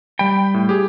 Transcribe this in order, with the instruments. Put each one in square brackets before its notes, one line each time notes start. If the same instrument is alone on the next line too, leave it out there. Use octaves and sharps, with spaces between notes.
[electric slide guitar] G3 G5 [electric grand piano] B5
[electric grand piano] A2
G4 G#4